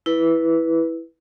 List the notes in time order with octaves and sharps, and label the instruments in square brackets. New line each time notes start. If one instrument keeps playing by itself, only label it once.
[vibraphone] E4 B4